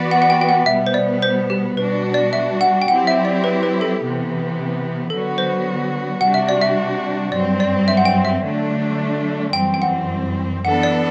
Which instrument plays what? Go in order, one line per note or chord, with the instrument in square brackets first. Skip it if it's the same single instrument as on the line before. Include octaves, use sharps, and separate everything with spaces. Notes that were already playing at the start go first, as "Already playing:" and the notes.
Already playing: [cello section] E3 B3 F#4 B4 D5
[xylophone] F#5
F#5
G5
G5
F#5
[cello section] B2 G3 B3 [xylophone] E5
[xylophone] C5
D5
C5
G4
[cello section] B2 G3 D4 F#4 [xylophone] B4
[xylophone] D5
E5
F#5
G5
[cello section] F#3 C4 E4 G4 [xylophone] F#5
[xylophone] E5
D5
B4
B4
A4
[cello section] C3 E3 B3
[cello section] D3 F#3 B3 F#4 [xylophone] A4
[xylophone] C5
[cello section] C3 G3 D4 F#4 [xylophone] F#5
[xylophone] E5
D5
E5
[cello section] G2 F#3 C4 [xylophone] D5
[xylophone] D5
E5
F#5
G5
E5
[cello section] D3 F#3 A3 D4
[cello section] F#2 E3 G3 C4 [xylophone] G5
[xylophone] G5
F#5
[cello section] E3 B3 D4 A4 [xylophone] F#5
[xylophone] D5